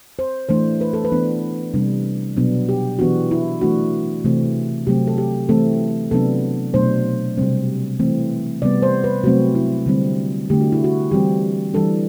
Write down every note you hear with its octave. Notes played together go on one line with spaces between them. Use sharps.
C5
E3 A3 D4 C5
B4
A4
B4
E3 B3 D4
C3 G3 D4
B2 F#3 B3 D4
G4
E3 B3 D4 F#4
E4
E3 A3 D4 F#4
C3 E3 A3 C4
C3 F#3 A3 C4 G4
A4
G4
E3 A3 C4 A4
C3 F#3 B3 D4 A4
B2 F#3 A3 D4 C5
C3 G3 C4
E3 A3 C4
C3 G3 B3 D5
C5
B4
C3 F#3 A3 C4 F#4
E4
D3 G3 C4
D3 A3 D4 G4
F#4
E4
F#4
E3 G3 C4 G4
E3 G3 D4 A4